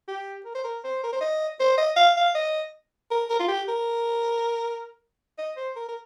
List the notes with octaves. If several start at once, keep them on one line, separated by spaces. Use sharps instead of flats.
G4
A#4
C5
A#4
C5
A#4
C5
D#5
C5
D#5
F5
F5
D#5
A#4
A#4
F4
G4
A#4
D#5
C5
A#4
A#4